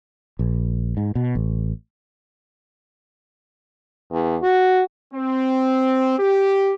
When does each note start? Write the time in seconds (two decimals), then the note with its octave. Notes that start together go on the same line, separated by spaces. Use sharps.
0.39 A#1
0.97 G#2
1.15 B2
1.35 A1
4.12 E2
4.43 F#4
5.14 C4
6.19 G4